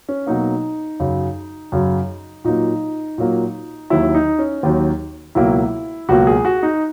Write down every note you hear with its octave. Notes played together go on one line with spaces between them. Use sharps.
C#4
B2 F#3 A#3 D#4
F#2 C#3 F#3
F#2 C#3 F#3
A#2 F#3 A#3 D#4
A#2 F#3 A#3
D#2 D#3 F#3 E4
D#4
C#4
D#2 D#3 F#3
C#2 B2 F#3 A#3 E4
C#2 B2 F#3 A#3 F#4
G#4
F#4
D#4